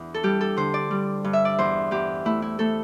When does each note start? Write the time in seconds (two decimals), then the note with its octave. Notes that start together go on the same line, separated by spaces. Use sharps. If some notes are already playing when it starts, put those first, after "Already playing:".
Already playing: E2 D4 E4
0.14 A4
0.23 G3 G4
0.41 A4
0.57 D3 C5
0.74 D5
0.91 G3
1.24 G2
1.33 E5
1.45 D5
1.58 E2 C5
1.91 E2 G4
2.25 A3 E4
2.42 E4
2.59 A3 A4